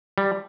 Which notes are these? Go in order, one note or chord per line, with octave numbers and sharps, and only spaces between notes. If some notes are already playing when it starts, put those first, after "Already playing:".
G3